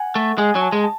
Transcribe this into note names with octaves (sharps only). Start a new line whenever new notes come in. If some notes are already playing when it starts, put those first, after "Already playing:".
Already playing: F#5 G#5
A3
G#3 G#5
F#3
A5
G#3
A5